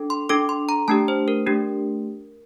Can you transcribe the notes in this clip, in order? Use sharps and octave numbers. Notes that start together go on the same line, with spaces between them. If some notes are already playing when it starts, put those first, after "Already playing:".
Already playing: D4 A4
C6
D4 A4 D6
C6
A#5
A3 D4 G4 A5
C5
A#4
A3 D4 G4